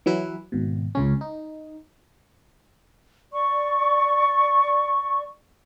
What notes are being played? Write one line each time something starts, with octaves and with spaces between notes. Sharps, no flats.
E3 F#3 E4 B4
G#1 B2
C#2 C#3 C#4
D#4
D5 C#6